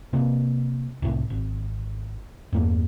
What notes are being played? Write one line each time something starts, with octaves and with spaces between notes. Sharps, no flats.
C3 A#3
C2 A2
G#1
E2 G2 A#3